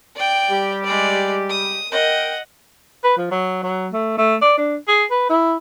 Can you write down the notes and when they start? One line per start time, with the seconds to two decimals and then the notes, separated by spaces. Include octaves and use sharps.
0.16 D5 G5
0.50 G3 G4
0.84 G#3 D5
1.50 D#6
1.92 A#4 D#5 F#5 G5
3.04 B4
3.17 F3
3.31 F#3
3.63 F#3
3.93 A3
4.18 A3
4.42 D5
4.58 D4
4.88 G#4
5.11 B4
5.29 E4